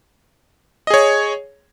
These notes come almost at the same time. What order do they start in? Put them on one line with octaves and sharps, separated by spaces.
D#5 G#4 C#5